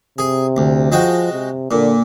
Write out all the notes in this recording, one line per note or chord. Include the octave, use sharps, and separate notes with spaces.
C3 G#4
D2
F3 G#3 F#4 G5
C3
A#2 D3